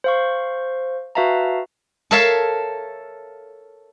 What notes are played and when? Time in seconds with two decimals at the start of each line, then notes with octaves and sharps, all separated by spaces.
0.04 C5 F5 C#6
1.15 F#4 B4 E5 F5 A5 A#5
2.11 A4 A#4 C#5 E5 F5 A5